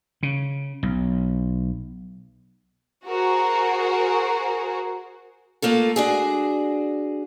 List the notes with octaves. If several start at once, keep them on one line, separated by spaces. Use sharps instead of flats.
C#3
B1
F#4 G#4 A#4 C5
A3 A#3 F4 A4
D4 F#4 G#4